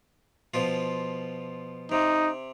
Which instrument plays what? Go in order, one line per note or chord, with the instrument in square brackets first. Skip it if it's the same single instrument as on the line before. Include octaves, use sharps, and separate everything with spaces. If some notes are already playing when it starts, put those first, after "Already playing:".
[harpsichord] B2 F3 F4
[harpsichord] C3 [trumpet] D#4